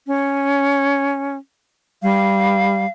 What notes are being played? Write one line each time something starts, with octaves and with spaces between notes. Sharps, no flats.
C#4
G3 F5